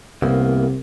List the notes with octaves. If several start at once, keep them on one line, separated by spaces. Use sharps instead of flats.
C2 C3 A#3 B3